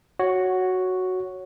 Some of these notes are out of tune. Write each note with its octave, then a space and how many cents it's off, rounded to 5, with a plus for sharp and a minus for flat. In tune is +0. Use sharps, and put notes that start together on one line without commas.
F#4 +0 C#5 +0